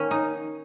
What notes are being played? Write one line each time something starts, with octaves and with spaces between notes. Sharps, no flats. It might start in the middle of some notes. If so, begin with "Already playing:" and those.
Already playing: D#3 A#3 C#4
D#4